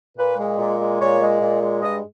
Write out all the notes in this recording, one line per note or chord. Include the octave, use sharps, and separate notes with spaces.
A#2 B4
G#3
A#2
G#3
A#2 C#5
G#3
A#2
G#3
G2 D#5